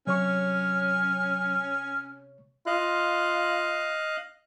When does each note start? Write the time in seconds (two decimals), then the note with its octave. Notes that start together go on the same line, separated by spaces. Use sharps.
0.07 C3 F#3 C#4 C#5 C#6 F6
2.67 F4 D#5 F5 F#6